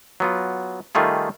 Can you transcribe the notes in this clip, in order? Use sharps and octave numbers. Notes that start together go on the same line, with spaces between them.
F#3 B3 F4
D#3 G3 A3 F4 G#4